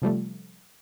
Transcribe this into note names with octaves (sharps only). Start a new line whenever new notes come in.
C3 F3 G3 A3